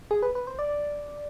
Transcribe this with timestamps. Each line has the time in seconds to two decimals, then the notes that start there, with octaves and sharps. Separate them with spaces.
0.11 G#4
0.22 B4
0.35 B4
0.47 C5
0.59 D5